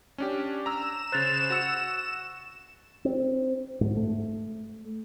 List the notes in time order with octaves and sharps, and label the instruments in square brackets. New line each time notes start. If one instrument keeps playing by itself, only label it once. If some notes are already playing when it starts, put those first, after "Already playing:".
[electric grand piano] C#4 D4 G4
[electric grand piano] A#5 E6 [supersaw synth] E7
[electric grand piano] C#3 C5 [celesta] F#6 A6 F7
[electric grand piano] F#4 E6 C#7
[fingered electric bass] C4
G#2
A3